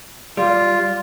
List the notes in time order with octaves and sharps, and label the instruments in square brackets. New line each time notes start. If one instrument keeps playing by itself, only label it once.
[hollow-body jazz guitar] G3 [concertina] F4